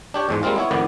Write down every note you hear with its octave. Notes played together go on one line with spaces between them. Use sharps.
D4 G4 C#5
E2 G#2 G#3
G3 G#3 A#3 C4 F4
B3 E4 C#5
F2 A2 D#3 B3 D5